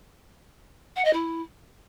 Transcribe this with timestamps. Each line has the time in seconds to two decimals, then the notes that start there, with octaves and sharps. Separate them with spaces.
0.96 F#5
1.05 D#5
1.13 E4